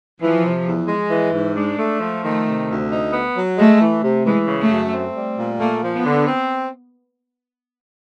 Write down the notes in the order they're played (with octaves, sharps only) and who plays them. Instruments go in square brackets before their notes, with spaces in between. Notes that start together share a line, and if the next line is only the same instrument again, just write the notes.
[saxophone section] E3 [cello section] F3
[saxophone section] C3
E2
G#3
E3
G#2
[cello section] G#3 [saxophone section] D4
[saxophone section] A3
F3
[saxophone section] D#3 [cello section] A3
[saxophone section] C3
D2
D#4
B3
F#3
[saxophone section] G#3 [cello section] A3
[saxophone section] E3
C3
[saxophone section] E3 [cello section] G#3
[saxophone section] C#3
[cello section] A3
[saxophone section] F#2
C4
G3
A#2
[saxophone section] A3 [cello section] A#3
[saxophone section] F3
[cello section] B3
[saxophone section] D3
C4